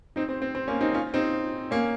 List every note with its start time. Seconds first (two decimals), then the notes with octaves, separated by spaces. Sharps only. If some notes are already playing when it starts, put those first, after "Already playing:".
0.16 C4 D#4
0.29 C4
0.42 C4
0.55 C4
0.68 A#3 C#4
0.81 C4 D#4
0.94 C#4 F4
1.14 C4 D#4
1.71 A#3 C#4